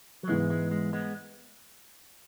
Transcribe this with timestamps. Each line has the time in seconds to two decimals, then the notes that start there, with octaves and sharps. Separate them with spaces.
0.23 F#3
0.28 G#2 E3 G#3 B3 E4 B4
0.50 G#3
0.71 G#3
0.93 G#3 B3